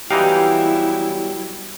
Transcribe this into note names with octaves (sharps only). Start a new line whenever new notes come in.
E3 F#3 G3 B3 D#4 E4 G4 F5